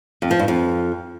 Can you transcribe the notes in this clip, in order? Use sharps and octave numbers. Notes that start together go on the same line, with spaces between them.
F2
F3
G2
F2